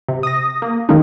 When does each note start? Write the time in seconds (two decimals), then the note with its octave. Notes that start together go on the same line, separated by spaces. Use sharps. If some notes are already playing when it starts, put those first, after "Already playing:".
0.08 C3
0.23 D#6 A#6
0.62 A#3
0.89 D#3 G#3 A#3 C#4 D#4